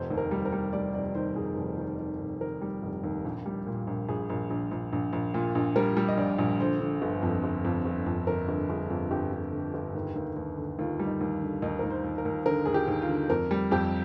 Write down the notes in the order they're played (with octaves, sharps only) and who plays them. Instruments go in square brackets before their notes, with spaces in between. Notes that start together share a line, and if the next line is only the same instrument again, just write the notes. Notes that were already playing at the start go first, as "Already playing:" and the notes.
Already playing: [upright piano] F1 C5
D#2
A#4
G3
A#4
G3
G3 D5
F1 D5
D#3 C5
F1 G#4
F1
D#3
D#3
F1
D#3 A#4
G3
F1
D#2
A#1
G3
A#2
A#1
A#1 G#4
A#1
A#1
A#1
A#1
A#1
A#2
A#1
G3 A#4
G3
D#5
A#1 D5
A#1
D3 C5
D3
G1
F2
G1
F2
G1
F2
D3 A#4
G1
G1 G#4
F2
G1 G4
G1
D3
G1
D#2
D#2
D#2
D3
D#2 F4
G3
D#4
D#2
D3
D#2 D#4
D#2 A#4
C5
D#2
A#4
D#2
D3 A#4
D#2 G#4
G4
D#2
F4
D3
F2 A#4
G3
F2 G4